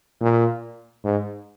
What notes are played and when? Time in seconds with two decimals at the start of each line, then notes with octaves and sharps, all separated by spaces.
0.21 A#2
1.04 G#2